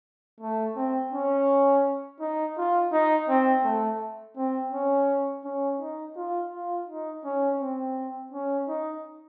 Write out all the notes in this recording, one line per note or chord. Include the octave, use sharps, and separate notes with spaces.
A3
C4
C#4
D#4
F4
D#4
C4
A3
C4
C#4
C#4
D#4
F4
F4
D#4
C#4
C4
C#4
D#4